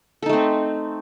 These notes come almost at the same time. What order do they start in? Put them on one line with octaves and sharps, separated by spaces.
A4 D#4 A3 C4